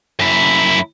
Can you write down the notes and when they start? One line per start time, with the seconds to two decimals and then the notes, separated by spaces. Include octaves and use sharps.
0.20 F#2 E4